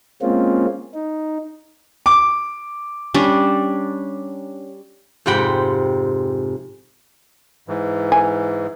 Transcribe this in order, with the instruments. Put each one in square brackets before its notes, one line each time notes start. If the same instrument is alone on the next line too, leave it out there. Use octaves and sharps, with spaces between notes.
[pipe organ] G#3 A#3 C4 C#4 F4
D#4
[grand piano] D6
[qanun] G3 C#4 D4
[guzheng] F2 G#2 C3 F#5 G5 B5
[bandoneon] G#2 E3
[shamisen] G#5